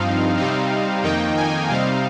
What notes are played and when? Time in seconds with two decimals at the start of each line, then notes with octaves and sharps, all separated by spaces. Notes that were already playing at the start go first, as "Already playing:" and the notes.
Already playing: G2 F3 C4 D#4 F5
0.37 C3 G3 C4 D#4
1.03 F2 D#3 A#3 D#4 G5
1.36 G#5
1.69 C3 G3 C4 D#4 F5